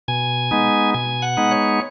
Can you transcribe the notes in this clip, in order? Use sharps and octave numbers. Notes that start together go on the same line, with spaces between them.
B2 G#5
G#3 B3 D#4
B2 G#5
F#5
G#3 B3 D#4
C#5